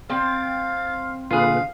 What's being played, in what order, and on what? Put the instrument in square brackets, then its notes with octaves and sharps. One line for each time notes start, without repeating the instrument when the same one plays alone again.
[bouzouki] C4 G5 [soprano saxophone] F5 [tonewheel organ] A6
[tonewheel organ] A#2 D3 B4 [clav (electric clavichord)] F4 G#4 [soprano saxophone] F5